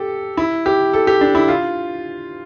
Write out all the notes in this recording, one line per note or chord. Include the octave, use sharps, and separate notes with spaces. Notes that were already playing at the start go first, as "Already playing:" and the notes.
Already playing: G4 A4
E4
G4
A4
G4
D4
E4
F4